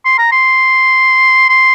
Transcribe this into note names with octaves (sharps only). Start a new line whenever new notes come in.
C6
A#5
C6
C6